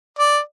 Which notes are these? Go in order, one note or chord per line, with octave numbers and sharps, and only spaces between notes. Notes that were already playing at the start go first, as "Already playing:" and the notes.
D5